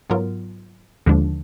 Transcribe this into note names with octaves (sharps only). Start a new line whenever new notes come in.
G#2 F#3 B3 F4 A#4
D#2 D3 F3 G#3 D4